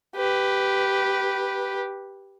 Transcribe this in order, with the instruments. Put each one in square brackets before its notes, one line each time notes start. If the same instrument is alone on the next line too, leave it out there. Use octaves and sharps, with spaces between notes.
[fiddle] G4 B4